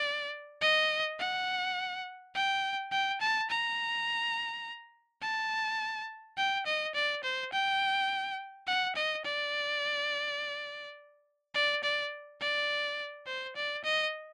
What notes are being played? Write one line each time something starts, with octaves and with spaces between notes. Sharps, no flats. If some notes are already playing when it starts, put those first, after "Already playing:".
Already playing: D5
D#5
F#5
G5
G5
A5
A#5
A5
G5
D#5
D5
C5
G5
F#5
D#5
D5
D5
D5
D5
C5
D5
D#5